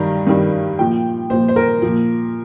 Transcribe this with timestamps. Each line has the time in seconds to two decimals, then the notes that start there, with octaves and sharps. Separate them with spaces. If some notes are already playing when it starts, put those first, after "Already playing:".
Already playing: G2 D#3 G3 A#5
0.27 G2 D#3 G3
0.79 A#2 F3 G5
1.30 A#2 F3 C5
1.48 C5
1.56 A#4
1.82 A#2 F3